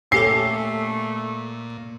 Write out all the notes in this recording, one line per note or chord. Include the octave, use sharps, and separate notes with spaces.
A#2 A3 C#4 G4 A4 C7